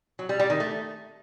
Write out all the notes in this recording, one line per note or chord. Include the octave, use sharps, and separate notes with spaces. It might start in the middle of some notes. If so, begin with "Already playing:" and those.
F#3
G3
G3
D#3
A3